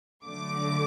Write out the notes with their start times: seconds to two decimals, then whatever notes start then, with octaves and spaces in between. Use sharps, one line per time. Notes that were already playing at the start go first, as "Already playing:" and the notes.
0.25 D3 F#3 A3 D6